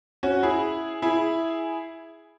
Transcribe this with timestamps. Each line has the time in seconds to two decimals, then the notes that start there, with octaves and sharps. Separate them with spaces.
0.23 C#4 F#4
0.43 E4 G#4
1.02 E4 G#4